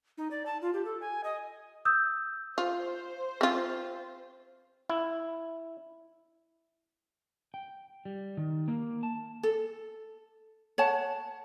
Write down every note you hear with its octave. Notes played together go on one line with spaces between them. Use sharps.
D#4
D5
A5
F4
G4
A4
G#5
D#5
D#6 E6 G6
F4 C5
C4 F4
E4
G5
G3
D#3
A#3
A5
A4
C#5 F#5 A5